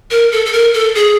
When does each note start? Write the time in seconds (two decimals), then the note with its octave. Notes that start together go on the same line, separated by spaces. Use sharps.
0.11 A#4
0.32 A4
0.46 A4
0.53 A#4
0.74 A4
0.95 G#4